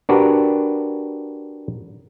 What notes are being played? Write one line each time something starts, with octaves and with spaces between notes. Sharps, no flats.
D4 F#4 G4 A#4 B4